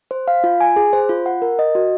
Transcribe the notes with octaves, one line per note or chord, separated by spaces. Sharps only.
C5
F5
F4
G#5
G#4
C5
F4
F#5
A#4
D#5
F#4